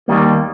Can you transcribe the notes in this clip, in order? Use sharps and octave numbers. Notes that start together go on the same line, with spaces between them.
D#2 D#3 G3 A#3